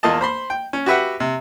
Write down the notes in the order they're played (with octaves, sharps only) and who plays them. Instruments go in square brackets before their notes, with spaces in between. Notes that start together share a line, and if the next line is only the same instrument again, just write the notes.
[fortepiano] E2 A#3 F4 D#5 A5
C5 B5 C6
G5
C#4
F#4 G4 B4 E5 F#5
C3